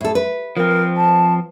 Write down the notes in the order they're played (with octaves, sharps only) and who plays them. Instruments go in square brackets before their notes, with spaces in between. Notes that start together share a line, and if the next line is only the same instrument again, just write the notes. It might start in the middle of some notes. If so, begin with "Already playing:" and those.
[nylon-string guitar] A2 A4
B4
[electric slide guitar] F3 C4 [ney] A#4
[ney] A5